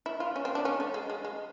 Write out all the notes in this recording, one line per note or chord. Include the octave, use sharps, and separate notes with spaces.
E4
F4
C#4
C4
D4
C#4
A3
G#3
G#3
G#3